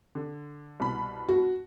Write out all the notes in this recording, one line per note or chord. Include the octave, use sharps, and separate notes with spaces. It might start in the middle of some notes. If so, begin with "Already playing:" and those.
D3
C2 B2 B5
F#4